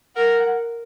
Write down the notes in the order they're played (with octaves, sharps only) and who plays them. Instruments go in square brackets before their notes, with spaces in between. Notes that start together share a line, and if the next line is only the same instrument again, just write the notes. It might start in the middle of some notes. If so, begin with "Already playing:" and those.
[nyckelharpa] A#4 [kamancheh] F#5